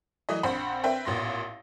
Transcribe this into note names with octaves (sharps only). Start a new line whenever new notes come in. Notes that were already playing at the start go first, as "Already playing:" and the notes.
E3 F#3 A3 D#5
A#1 C4 C5 F#5 B5
C4 B4 E5 G5
A1 A#2 B3 C6 A#6